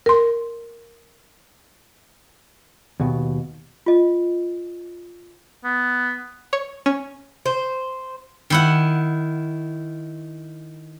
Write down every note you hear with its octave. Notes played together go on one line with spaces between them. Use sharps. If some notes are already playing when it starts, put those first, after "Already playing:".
A#4 C6
D#2 B2
F4 D#5
B3
C#5
C#4
C5
D#3 E4 F#5